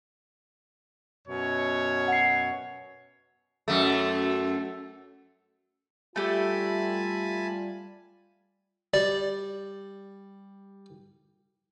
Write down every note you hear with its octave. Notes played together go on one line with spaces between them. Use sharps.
F#2 B2 C#5
F#5 C7
F#2 A3
G3 A3 F4 G4 G#5 A5 B5
G3 D5